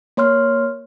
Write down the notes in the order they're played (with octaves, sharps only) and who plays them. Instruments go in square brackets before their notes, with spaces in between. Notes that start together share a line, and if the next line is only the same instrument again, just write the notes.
[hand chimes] A#3 C#5 C6 F6